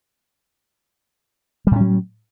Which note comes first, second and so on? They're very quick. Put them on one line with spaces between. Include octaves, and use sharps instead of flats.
G3 A2 C#4 F#3